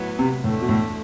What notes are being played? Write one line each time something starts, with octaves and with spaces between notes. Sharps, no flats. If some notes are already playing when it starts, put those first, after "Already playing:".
Already playing: A2 F#3 B3 E4
C3
E2 A2 D3 A3
B2
A2